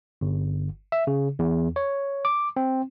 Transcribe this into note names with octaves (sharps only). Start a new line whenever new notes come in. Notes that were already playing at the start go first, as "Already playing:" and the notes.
G1
E5
C#3
E2
C#5
D6
C4